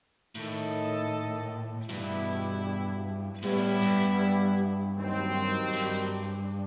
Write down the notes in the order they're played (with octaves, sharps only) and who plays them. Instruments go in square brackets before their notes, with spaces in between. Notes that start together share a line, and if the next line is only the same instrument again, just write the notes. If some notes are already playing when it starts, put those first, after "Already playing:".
[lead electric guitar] A2 [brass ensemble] D#3 A3 E4 A4 D#5
[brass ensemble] E2 B2 G3 B3 E4 [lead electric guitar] G2
[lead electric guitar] A2 [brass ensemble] G3 B3 E4
[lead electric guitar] G2
[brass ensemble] D#2 D#3 F#3 C4
[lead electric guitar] G2